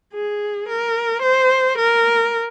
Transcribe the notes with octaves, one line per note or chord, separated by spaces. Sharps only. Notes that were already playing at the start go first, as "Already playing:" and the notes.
G#4
A#4
C5
A#4